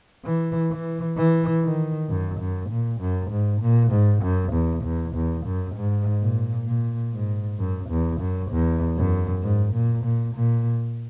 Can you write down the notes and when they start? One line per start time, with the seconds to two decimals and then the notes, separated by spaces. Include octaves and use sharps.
0.25 E3
0.71 E3
1.17 E3
1.63 D#3
2.09 F#2
2.40 F#2
2.70 A#2
3.01 F#2
3.31 G#2
3.62 A#2
3.92 G#2
4.23 F#2
4.53 E2
4.84 E2
5.15 E2
5.46 F#2
5.76 G#2
6.22 A#2
6.68 A#2
7.14 G#2
7.59 F#2
7.91 E2
8.21 F#2
8.51 E2
8.97 F#2
9.43 G#2
9.74 A#2
10.05 A#2
10.36 A#2